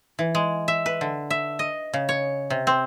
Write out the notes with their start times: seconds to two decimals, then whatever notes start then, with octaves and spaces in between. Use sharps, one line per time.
0.19 E3
0.35 G#3
0.68 E5
0.86 B4
1.01 D3
1.30 E5
1.59 D#5
1.93 C#3
2.09 C#5
2.50 C3
2.67 C4